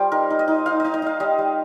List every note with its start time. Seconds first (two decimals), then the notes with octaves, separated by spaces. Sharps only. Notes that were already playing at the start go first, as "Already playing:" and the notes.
Already playing: G3 F4 C5
0.12 D#4 A#4
0.30 D#4
0.39 D#5
0.48 D#4
0.66 D#4 F5
0.80 D#4 D#5
0.94 D#5
1.02 D#4 F5
1.20 G3 D#5
1.38 G3